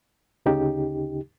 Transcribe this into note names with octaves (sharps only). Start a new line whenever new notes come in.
D2 C#3 D#4 G4